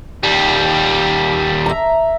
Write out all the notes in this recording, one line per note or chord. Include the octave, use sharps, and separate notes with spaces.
D#2 G3
E5 A#5